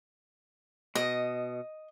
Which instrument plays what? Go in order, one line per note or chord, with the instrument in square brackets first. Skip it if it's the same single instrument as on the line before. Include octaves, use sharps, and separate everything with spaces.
[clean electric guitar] B2 [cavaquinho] D#5